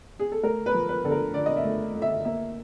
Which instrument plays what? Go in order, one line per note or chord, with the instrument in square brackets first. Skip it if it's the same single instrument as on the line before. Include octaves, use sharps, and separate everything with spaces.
[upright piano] G#4
A4
A3 A#4
B4
F3
B4
D3 A4
A#4
D3 D5
D#5
E5
A3
A3
E5
A#3 E5